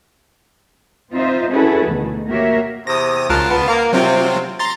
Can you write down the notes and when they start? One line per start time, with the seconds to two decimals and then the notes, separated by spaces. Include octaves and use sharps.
1.13 C4 D#4 F4 C5 D#5 E5
1.51 C#4 E4 F#4 G#4 A4 B4
1.86 D2 B2 D#3
2.28 A#3 F#4 G4 A#4 C#5 E5
2.87 E2 C3 D#6 A#6
3.30 C#2 F#2 F4 A#4 F#5 A5
3.49 B3
3.68 A#3 F5
3.93 C3 F#3 C4 F4
4.59 A#5 C6 A6